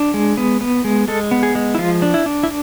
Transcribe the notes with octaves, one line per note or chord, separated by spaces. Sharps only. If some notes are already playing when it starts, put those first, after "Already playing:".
Already playing: D4
G#3
B3
B3
G#3
G#3 A4
B3
G#4
G#3
E4
F3 F4
D4
E4
D4
E4